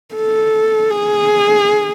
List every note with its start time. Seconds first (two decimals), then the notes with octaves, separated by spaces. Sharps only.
0.15 A4
0.90 G#4